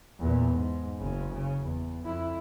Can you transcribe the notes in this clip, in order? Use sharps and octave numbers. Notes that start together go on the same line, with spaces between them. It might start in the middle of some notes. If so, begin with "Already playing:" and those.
E2 A#2
G#2
F#1 C#3
C#3
E2
F2 E4